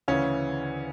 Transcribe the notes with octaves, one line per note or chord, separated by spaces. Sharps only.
D2 C#3 E3 C#4